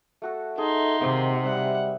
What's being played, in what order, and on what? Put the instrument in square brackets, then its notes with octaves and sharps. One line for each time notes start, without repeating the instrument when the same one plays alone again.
[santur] A3 F#4 A4
[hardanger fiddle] D#4 C6 [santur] G#4 E5 [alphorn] A4
[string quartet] C3 [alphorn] D#3 [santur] G#3 A#3 C5
[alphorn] G3 [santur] E5 [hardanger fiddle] F#5